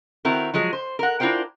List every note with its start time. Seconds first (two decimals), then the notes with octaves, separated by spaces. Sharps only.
0.25 D#3 C4 E4 F#4 A#4
0.54 F3 F#3 G#3 G#4
0.73 C5
0.99 A#4 F#5
1.20 D4 E4 F4 A#4 C5 G5